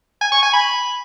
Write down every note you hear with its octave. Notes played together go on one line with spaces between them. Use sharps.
G#5
C#6
G#5
B5